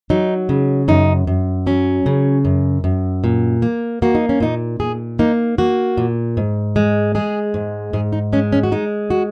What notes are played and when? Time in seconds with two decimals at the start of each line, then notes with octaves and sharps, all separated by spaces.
0.10 F#3 D#4
0.49 C#3
0.88 F#2 D#4
1.27 F#2
1.66 F#3 C#4
2.06 C#3
2.45 F#2
2.84 F#2
3.24 A#2
3.62 A#3
4.02 A#3 F#4
4.15 D#4
4.29 C#4
4.40 A#2 D#4
4.80 A#2 G#4
5.19 A#3 D#4
5.58 A#3 F#4
5.97 A#2
6.37 G#2
6.76 G#3
7.15 G#3 G#4
7.54 G#2
7.93 G#2 G#4
8.12 D#4
8.33 G#3 C#4
8.52 C#4
8.63 F#4
8.72 G#3 D#4
9.10 F#4